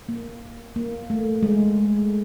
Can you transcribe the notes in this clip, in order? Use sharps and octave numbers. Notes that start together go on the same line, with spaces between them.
A#3
A#3
A3
G#3